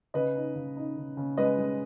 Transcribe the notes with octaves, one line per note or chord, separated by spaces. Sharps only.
C#3 B4 D#5
D#4
C#3
D#4
C#3
C#3
G#3 B4 D#5
G#3